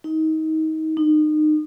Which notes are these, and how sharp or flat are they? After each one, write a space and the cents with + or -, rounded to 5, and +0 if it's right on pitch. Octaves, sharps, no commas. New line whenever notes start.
D#4 +25
D#4 -30